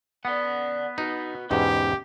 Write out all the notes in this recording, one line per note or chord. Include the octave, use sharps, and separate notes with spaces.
B3 D5 F#5
D#4 F#4 B4
E2 G#2 B2 C#4 G4 C#5